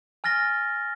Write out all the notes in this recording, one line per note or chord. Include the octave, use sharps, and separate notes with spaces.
G#5 F6 A6 A#6 G7